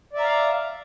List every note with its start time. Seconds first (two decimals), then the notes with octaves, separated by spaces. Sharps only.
0.13 D5
0.17 E5
0.20 A#5
0.24 F5